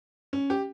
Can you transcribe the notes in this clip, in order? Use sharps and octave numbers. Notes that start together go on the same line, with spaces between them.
C#4
G4